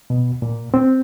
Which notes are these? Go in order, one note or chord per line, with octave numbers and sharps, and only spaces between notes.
B2
A#2
C4